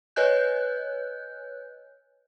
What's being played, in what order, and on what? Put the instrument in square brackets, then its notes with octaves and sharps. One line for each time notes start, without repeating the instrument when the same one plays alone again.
[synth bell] B4 C#5 D#5 G#5 F#6 G6